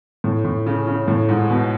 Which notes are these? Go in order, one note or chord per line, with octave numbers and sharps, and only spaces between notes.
A2
A2
C#3
C#3
A2
G#2
B2